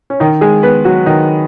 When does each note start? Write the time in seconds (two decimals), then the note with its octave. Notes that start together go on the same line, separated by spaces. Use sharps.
0.10 C#4
0.20 D#3 D#4
0.41 G#3 G#4
0.63 B3 B4
0.85 F#3 F#4
1.06 D#3 D#4